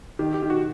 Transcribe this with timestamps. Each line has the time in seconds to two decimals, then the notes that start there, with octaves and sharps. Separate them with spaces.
0.19 D#3 G4
0.34 G4
0.43 D#3
0.50 F#4